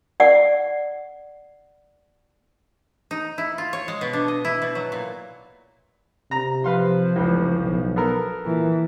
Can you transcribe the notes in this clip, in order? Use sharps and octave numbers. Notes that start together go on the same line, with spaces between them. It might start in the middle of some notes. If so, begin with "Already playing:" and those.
D5 F#5
D#4
E4
F4
C#5
G#3
B2
D4
D#5
E4
B2
F#3
A#2
C3 A#5
F3 B4 F5 C6
F1 C#2 E3
B1
B3 A4 A#4
A#2 E3